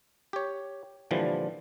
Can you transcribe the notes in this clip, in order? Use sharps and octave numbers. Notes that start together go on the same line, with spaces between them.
G4 C#5
A#2 D3 E3 F3 G3